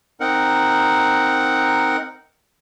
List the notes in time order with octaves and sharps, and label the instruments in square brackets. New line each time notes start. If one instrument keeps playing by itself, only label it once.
[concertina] C4 D#4 A#4 F#5